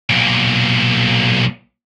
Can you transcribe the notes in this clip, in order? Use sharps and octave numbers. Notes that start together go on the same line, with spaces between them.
B1 A#2